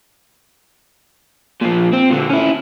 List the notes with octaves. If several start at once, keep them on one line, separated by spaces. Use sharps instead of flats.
A#2 F3
C4
A#2 D3
C#4 E4